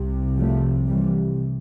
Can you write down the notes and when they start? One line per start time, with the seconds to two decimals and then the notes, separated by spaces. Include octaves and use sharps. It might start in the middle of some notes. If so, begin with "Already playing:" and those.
Already playing: C2 C3
0.38 F3 A3
0.88 E3 G3